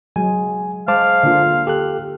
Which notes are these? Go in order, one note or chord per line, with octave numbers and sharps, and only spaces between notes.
F#3 G#3 G#5
G#3 C5 F5 A5 D6
D3 A#3 F4
G4 A4 F#6